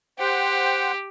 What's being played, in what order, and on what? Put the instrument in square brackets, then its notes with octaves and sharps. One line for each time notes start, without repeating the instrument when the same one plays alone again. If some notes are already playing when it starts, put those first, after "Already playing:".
[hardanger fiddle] G4 [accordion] C5 F#5 G5